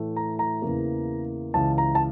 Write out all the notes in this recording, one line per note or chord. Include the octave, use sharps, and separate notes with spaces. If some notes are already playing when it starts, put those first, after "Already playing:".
Already playing: A2 E3 A3
A#5
A#5
E2 C#3 E3 A#3
C#2 C#3 E3 A5
A#5
A5